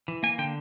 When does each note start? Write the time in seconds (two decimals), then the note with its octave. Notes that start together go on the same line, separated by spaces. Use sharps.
0.08 E3
0.23 A#3 G#5
0.38 D3 G5